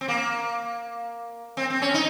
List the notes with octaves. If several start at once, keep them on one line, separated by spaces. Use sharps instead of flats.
C4
A#3
C4
C4
C#4
D#4